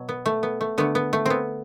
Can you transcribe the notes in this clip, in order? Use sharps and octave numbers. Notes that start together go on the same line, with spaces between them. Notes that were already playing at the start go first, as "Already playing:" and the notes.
Already playing: B2 F#3
B3
A3
B3
A3
D3 A3 B3
B3
A3
B3 C4